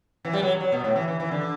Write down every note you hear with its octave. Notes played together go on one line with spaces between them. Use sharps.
E3
G3
F#3
F#3
B2
A2
E3
E3
E3
D3